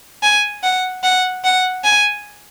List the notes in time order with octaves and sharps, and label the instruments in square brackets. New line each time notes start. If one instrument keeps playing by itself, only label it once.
[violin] G#5
F#5
F#5
F#5
G#5